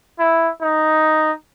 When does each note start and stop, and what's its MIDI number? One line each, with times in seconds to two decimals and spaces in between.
0.19 0.49 64
0.62 1.32 63